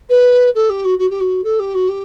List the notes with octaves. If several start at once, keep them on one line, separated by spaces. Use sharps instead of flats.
B4
A4
G4
F#4
F#4
G4
F#4
A4
G4
F#4
G4